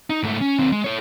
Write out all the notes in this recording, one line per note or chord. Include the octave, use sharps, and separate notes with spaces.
D#4
G#2 A3
C#4
D#2 C4
G#3
A4 C#5